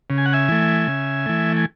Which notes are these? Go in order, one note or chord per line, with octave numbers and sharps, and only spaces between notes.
C#3
G#5
F#5
E5 G#5
E3 A3
C#3
E3 A3
G#5